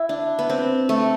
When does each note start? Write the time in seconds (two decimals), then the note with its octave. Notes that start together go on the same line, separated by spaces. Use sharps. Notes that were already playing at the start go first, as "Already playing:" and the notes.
Already playing: E4
0.09 D4
0.39 B3
0.50 C4
0.89 A3